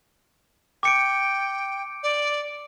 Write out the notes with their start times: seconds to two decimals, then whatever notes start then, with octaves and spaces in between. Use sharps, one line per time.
0.83 G5 D6 C#7 D7
2.03 D5